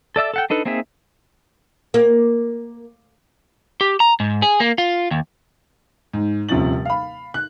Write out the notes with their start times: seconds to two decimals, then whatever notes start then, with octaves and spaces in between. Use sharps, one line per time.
0.16 A4 D5 E5 E6
0.34 A4 F#5 G5
0.50 D4 D#4 A4 B4
0.65 A#3 C4 D#4 G#4 E5
1.94 A#3
3.81 G4
4.00 A#5
4.20 G#2
4.42 G#4
4.60 A#3
4.78 F4
5.11 D#2
6.13 G#2
6.49 D#1 C3 F3 C#4 A6 F#7
6.85 F5 B5
7.34 F#6